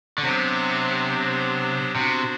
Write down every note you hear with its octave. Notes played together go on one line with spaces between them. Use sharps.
D3
C3 F#3 B3 D4 G4 C5
C3 B3 D4 F#4 C5